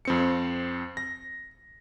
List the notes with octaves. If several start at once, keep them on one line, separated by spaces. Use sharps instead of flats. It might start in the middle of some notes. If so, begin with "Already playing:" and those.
F2 C4 C#7
A#6